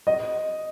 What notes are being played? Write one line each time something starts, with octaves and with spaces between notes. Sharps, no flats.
D#5